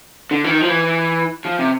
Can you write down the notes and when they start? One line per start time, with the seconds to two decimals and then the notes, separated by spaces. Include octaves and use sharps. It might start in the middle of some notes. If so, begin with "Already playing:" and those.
0.31 D3
0.44 E3
0.50 D#3
0.61 F3
0.69 E3
1.45 F3
1.59 C3